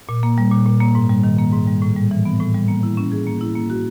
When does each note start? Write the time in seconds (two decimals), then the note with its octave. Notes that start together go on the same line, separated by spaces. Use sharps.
0.09 A#2
0.23 A#3
0.38 G3
0.52 A#2
0.66 A#2
0.81 A#3
0.95 G#2
1.09 G3
1.24 D#3
1.38 A#3
1.52 G#2
1.67 G3
1.82 A2
1.96 G3
2.11 E3
2.25 B3
2.40 A2
2.54 G3
2.68 A#3
2.83 E4
2.97 C#4
3.12 G#4
3.27 A#3
3.41 E4
3.55 A#3
3.70 F#4